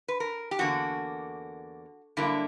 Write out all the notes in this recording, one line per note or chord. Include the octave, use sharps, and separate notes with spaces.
B4
A#4
G4
E2 D3 A#3 F#4
G2 D3 F#3 A#3 E4